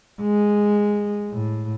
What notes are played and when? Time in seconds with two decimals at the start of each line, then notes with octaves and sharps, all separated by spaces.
0.21 G#3
1.31 A2